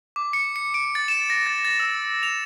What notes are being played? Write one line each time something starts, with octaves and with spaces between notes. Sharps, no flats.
D6
C#7
C#7
D7
A6
E7
A#6
A6
A6
E6
F7